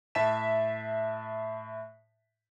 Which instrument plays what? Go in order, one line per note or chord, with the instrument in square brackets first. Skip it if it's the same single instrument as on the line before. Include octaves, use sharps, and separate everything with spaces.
[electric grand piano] A2 E5 A5 B6 E7